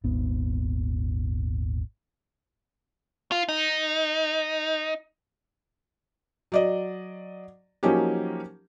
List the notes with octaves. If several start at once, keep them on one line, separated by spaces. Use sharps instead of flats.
D#1 G#1 B3
F4
D#4
F#3 D5 D#5
F3 F#3 A#3 C#4 D#4 G4